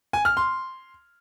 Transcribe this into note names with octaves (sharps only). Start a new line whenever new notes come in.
G#5
F6
C6